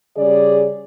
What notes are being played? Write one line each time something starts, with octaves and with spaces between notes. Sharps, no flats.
C#3 G3 G#4 D5